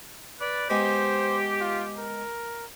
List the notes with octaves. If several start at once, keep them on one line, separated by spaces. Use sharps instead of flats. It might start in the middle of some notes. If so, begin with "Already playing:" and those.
B4 D5
G#3 B3 G4 C5 D#5
F4
A#4